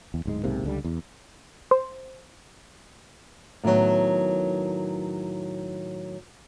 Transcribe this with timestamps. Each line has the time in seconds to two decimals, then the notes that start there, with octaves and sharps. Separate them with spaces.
0.14 E2
0.25 D1 G#2 G#3
0.43 B1 G#2 C3 A#3
0.63 C#2 D3 G3
0.84 E2
1.71 C5
3.64 A2 D#3 E3 F#3 B3